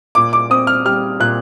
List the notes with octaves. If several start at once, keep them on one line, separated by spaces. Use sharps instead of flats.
A#2 D6
D6
C4 D#6
F6
G3 F6
A#2 F#6